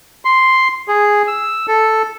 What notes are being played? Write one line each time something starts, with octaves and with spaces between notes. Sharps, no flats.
C6
G#4
E6
A4